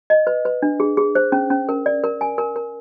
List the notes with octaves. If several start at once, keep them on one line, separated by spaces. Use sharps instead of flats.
D#5
B4
B4
D4
G#4
G#4
C5
C#4
C#4
A#4
D5
A#4
G#5
A#4
A#4